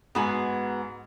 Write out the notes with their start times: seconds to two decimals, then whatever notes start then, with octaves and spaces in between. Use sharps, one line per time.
0.15 G#2 B3 F#4 G#4